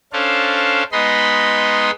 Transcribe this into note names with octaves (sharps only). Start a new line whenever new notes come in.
C#4 D4 A4 C5 F5
G#3 B3 D#4 D#5 B5 C6